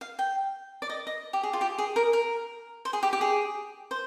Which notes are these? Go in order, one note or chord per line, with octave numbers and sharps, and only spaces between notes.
F5
G5
D5
D#5
D#5
G4
G#4
F4
G4
G#4
A#4
A#4
C5
G#4
G4
G4
G#4
C5